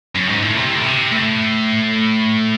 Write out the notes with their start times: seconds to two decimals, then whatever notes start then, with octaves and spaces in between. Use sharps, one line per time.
0.15 F#2
0.29 G#2
0.43 A2
0.57 C3
0.74 A2
0.84 C3
1.12 A2